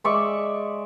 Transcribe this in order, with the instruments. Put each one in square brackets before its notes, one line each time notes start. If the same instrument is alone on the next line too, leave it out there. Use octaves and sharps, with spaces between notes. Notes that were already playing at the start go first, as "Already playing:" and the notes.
[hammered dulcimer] G#3 D5 E5 C#6